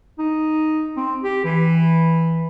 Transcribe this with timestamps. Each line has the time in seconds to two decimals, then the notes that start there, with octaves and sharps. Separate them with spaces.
0.19 D#4
0.97 C4
1.23 G4
1.45 E3